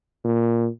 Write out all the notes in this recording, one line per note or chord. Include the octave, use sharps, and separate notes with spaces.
A#2